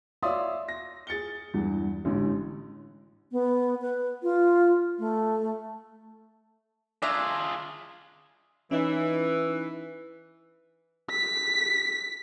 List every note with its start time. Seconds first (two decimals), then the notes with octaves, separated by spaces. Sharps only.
0.23 C#5 D5 E5 F5 C6 D#6
0.69 A#6
1.07 G#4 A6 C#7 G7
1.54 E2 G2
2.05 A1 G#2 D3
3.32 B3
3.82 B4
4.23 F4
4.99 A3
7.02 D4 F4 G#4 E5 A#5
8.71 E3 C#4 D#4
11.11 B6